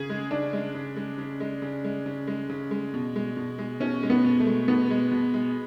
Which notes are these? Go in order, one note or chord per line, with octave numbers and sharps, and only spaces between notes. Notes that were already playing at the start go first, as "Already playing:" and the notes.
Already playing: C#3 G#4
G#3
C#3 D4
G#3
C#3
G#3
C#3
G#3
C#3
G#3
C#3
G#3
C#3
G#3
B2
G#3
B2
G#3
B2 C#4
G#3
B3
B2
A3
G#3
B2 B3
G#3
B2
G#3